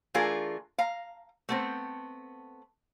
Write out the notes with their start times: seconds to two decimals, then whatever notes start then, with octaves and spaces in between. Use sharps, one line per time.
0.14 E3 A3 D4 F4 G#4 A#4
0.78 F5 A#5
1.49 A3 B3 C4